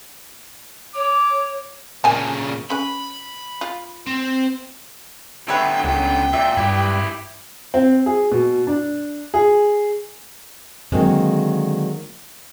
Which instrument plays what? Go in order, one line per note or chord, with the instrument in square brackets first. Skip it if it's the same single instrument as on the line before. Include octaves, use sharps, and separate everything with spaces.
[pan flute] C#5 [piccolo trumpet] D6
[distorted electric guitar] A#2 C#3 [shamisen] A#4 G#5 A5
[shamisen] C#4 B4 [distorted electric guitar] B5
[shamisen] F4
[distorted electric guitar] C4
[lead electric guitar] D3 B3 [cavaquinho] B4 C#5 E5 [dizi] G5
[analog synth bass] C#2 [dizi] G5
[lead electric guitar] A#2 [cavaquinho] E5
[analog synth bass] G2 [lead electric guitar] E4 G4
[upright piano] C4
G#4
B2
D4
G#4
[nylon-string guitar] D3 D#3 F#3 G#3 A#3 C4